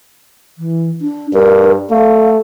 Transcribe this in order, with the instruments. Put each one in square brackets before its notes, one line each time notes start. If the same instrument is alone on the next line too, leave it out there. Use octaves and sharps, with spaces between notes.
[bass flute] E3
D4
[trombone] G2 [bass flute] A#4
[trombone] A3 [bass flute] F5